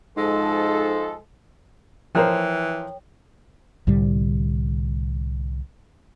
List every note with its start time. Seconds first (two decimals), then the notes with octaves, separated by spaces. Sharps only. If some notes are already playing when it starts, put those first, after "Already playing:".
0.17 G#2 F3 G#3 A4
2.15 E3 F3 A#4 C5 C#5 G5
3.87 C2 A2 D3 G3